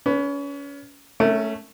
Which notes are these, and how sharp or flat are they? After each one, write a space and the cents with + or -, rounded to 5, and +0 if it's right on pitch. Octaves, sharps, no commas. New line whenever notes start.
C#4 +30 B4 +0
A3 -5 C#4 +0 A#4 -40